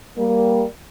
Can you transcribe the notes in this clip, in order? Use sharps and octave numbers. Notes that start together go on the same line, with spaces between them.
G3 A#3